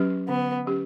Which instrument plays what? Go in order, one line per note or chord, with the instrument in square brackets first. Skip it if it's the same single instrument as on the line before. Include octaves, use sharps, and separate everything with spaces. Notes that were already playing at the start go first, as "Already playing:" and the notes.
Already playing: [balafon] F#3 C#4 G4 B4
[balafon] D3 [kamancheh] B3
[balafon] F#3 C#4 G4 B4